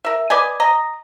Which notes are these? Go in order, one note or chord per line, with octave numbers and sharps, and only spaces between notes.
A#4 E5
B4 D5 D#5 G#5
D#5 A#5